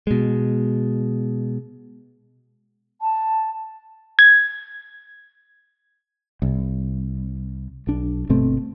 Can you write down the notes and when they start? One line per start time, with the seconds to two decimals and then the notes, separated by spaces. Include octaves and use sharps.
0.07 B2 G#3
3.00 A5
4.19 G#6
6.42 C2
7.87 B1 D4
8.29 G1 B2 A3 C4